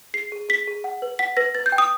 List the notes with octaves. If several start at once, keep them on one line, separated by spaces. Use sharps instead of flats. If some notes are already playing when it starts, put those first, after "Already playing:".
G#4 C7
G#4
G#4 B6
G#4
F#5
B4
F#5 B6
B4 A#6
B4 A6
G6
G5
D#6